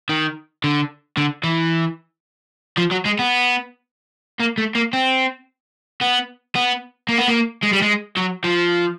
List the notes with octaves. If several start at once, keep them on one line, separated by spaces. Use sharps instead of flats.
D#3
D3
D3
E3
F3
F#3
G#3
B3
A#3
A3
A#3
C4
B3
B3
A#3
B3
A#3
G#3
G3
G#3
F#3
F3